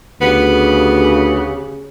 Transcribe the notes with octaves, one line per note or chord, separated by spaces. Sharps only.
D2 C#3 B3 G4